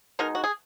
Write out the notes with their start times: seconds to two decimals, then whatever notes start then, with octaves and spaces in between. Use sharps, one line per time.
0.19 B2 G#3 D#4 A#4
0.35 F#4
0.44 G#4